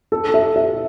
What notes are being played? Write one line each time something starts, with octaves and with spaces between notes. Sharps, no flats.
A4
E5
E5